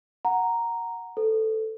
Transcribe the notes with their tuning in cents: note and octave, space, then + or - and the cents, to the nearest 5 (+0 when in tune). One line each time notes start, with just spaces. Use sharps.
F#5 +0 A#5 +0
A4 +0 C5 -45